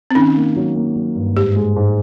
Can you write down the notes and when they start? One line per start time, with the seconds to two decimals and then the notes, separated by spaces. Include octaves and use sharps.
0.11 C4
0.15 D#3 C#4
0.36 A#3
0.56 F#3
0.76 A#3
0.96 F#3
1.16 G2
1.36 G#2 G4
1.56 G#3
1.76 G#2